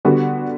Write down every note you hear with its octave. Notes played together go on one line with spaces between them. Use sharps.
D3 G3 B3 F#4